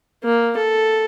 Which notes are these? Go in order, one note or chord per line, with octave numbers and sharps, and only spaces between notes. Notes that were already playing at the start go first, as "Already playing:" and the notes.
A#3
A4